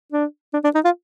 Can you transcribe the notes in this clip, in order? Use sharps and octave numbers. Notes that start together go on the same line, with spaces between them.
D4
D4
D4
D#4
F4